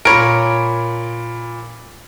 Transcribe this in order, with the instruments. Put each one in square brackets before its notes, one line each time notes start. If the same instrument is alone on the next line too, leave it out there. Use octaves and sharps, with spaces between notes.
[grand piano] A#2 B5 D7 [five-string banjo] A#4 C#5